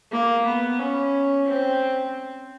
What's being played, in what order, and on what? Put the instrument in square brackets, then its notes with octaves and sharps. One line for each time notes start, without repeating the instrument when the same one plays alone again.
[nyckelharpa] A#3
B3
C#4
C4